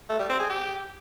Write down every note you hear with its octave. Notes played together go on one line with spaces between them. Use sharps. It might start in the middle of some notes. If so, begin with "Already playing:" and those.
A3
G3
C4
G#4
G4